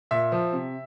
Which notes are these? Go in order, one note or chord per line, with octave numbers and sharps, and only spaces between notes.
A#2 E5
F3
C3